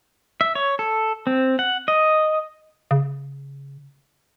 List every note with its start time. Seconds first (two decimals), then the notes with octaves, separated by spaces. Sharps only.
0.41 E5
0.55 C#5
0.79 A4
1.27 C4
1.59 F#5
1.88 D#5
2.91 C#3